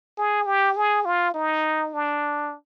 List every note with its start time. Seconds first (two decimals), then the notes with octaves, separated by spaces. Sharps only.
0.18 G#4
0.46 G4
0.77 G#4
1.05 F4
1.34 D#4
1.93 D4